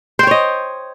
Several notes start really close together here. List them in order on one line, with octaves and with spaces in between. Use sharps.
C5 G5 C#5 D#5